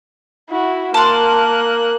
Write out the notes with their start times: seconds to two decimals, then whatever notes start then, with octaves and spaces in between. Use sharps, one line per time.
0.49 E4 F#4
0.94 A#3 A5 C6 F#6